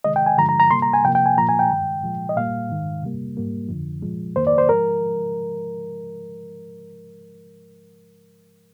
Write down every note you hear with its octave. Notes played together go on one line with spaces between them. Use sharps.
C3 D#3 G#3 D#5
G5
G#5
G2 D3 F3 G#3 A#5
A#5
A#5
C3 G3 A#3 C6
A#5
G#5
C3 F3 A#3 G5
G5
G#5
A#2 F3 A#3 A#5
G#5
G5
G2 D#3 G#3
A#2 F3 G#3
D#5
A#2 G3 A#3 F5
G#2 D#3 G#3
C3 G3 A#3
G#2 G3 A#3
F2 D3 F3
A#2 F3 G#3
F2 D#3 A#3 C5
D5
C5
G#2 F3 G#3 A#4